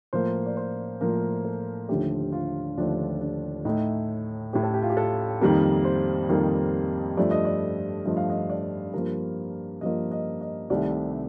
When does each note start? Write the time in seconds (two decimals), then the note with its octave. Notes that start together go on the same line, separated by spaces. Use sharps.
0.13 A2 F3 A#3 C5
0.46 D5
0.57 C5
1.01 A2 F3 A#3 A#4
1.45 A4
1.89 D#2 D3 F3 A3 G4
2.32 F4
2.77 D#2 D3 F3 A3 D4
3.21 D4
3.65 A2 A3 D#4
4.53 A2 A3 G4
4.63 A4
4.74 G4
4.83 F4
4.90 G4
4.97 A4
5.41 F2 D#3 G3 A#3 A#4
5.85 C5
6.29 F2 D#3 G3 A#3
7.17 G2 F3 A3 D5
7.31 D#5
7.45 D5
8.05 G2 F3 A3 D#5
8.17 F5
8.30 D#5
8.50 D5
8.93 G2 F3 A#3 A#4
9.81 G2 F3 A#3 D#5
10.11 D#5
10.41 D#5
10.70 C2 C3 D#3 A3 D5